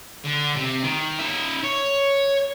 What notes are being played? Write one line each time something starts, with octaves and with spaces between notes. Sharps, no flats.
D3
C3
D#3
D#4 E5
C#5